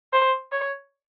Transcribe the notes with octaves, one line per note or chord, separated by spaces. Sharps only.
C5
C#5